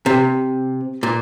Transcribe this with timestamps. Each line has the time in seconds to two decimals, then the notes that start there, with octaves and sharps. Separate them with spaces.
0.06 C3
1.03 A#2